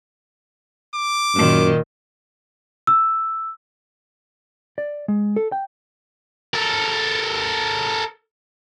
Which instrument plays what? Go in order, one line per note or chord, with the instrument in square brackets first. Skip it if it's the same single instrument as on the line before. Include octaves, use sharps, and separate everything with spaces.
[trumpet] D6
[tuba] F#2 [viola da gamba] A#2 D#3
[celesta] E6
[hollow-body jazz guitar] D5
G#3
A4
G5
[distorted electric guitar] A4 A#4